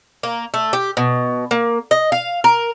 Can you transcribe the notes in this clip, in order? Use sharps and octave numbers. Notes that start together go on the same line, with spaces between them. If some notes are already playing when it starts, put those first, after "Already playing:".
A#3
A3
G4
B2
A#3
D#5
F5
A#4